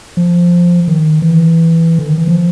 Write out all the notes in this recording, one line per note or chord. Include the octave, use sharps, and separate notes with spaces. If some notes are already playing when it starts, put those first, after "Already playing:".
F3
D#3
E3
D3
D#3
E3
F3